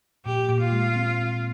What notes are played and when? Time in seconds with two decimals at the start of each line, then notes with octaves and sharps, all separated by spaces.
0.25 A#2 G4
0.49 A#2
0.61 F4
0.72 G#3
0.96 C4
1.19 A#2